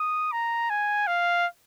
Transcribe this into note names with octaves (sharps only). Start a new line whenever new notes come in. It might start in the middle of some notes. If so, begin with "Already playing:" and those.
Already playing: D#6
A#5
G#5
F5